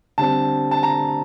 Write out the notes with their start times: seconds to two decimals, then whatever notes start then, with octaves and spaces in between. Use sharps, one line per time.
0.18 D3 G3 C4 A5
0.71 A5
0.83 A#5